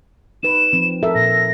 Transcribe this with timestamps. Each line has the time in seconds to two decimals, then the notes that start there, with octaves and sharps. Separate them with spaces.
0.43 D#4 B4 E7
0.73 F3 C4
1.03 A4 A#4 E5
1.15 A#2 A#6